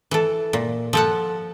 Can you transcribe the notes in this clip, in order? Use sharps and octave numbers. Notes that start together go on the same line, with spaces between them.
E3 A4
A#2
F3 A4 F#5